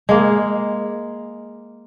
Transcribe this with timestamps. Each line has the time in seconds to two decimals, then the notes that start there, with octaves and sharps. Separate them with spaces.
0.09 G#3 A#3